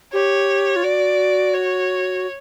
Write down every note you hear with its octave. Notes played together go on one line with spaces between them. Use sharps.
G4 C#5
F4
F#4 D5
C#5